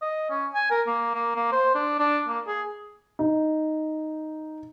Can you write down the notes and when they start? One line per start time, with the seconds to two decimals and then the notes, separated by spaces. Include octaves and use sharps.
0.02 D#5
0.31 C#4
0.55 G#5
0.71 A#4
0.87 A#3
1.15 A#3
1.36 A#3
1.52 C5
1.75 D4
2.00 D4
2.28 A#3
2.47 G#4
3.19 D#4